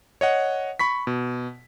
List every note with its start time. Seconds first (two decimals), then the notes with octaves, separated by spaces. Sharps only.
0.21 C#5 D#5 F#5
0.79 B5 C#6 B6
1.07 B2